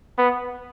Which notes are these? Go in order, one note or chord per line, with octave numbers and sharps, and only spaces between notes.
B3